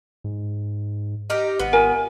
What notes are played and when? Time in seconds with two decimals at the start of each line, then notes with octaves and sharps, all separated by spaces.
0.24 G#2
1.30 D#4 G4 A#4
1.60 G#1 B3
1.73 F4 A#4 G#5